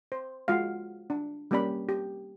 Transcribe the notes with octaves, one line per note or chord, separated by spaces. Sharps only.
C5
G#3 F4 F#4 F5
D4
G3 A#3 C#4 G4 D5 B5
G4